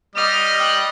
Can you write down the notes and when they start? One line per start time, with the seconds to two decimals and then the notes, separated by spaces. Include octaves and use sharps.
0.16 G3 D#5 F6
0.58 G5 F#6